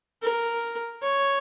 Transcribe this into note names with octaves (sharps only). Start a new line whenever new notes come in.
A#4
C#5